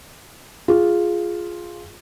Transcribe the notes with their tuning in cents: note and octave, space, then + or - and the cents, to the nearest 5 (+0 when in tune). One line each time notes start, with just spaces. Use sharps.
F4 +0 G#4 +0